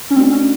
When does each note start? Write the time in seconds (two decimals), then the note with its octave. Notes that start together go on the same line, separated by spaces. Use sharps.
0.10 C#4
0.16 A3 C4 D4 F#4
0.31 C#4